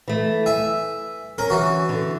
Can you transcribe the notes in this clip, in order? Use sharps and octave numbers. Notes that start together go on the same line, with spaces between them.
E3 A3
E5 G#5
C#4 A#4
E3 F#4
D3